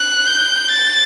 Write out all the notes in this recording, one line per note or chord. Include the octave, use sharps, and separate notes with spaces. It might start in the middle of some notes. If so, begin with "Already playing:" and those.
Already playing: F#6
G6
A6